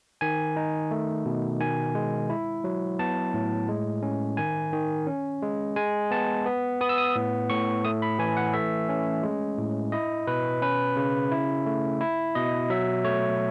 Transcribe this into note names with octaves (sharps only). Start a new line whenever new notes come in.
D#3 G#5
D#4
A3
B2
D#3 G#5
G#3
E4
F#3
B3 A5
A2
G#3
C#4
D#3 G#5
D#3
C#4
G#3
G#3 G#5
B3 A5
B3
B3 D#6
E6
D#6
A2
A2 C#6
A3 D#6
B5
E3 G#5
F#5
A3 E5
C#4
G#3
A2
E4 D#5
B2 B4
C#4 B4
C#3
E4
A3
E4
B2 D#5
F#3 E5
A3 C#5